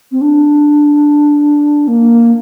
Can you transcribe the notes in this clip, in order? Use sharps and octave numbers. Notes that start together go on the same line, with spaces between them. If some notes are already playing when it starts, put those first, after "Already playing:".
C4
D4
A#3